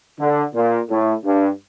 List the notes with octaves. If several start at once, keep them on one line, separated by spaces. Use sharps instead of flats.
D3
A#2
A2
G2